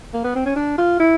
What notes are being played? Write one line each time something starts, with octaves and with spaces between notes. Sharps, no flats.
A#3
B3
C4
C#4
D4
F4
E4